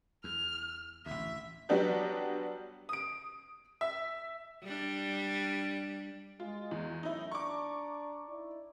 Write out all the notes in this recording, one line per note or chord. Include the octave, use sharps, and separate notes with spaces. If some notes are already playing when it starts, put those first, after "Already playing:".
E2 F6
A1 D2 E5
F#3 G3 B3 D4 G4
D#6 D7
E5
G3 D4
G#3 F4
E2
F#2 A2 D#4 E4
D4 D5 A#5 C#6 D6
D#4 E4 D5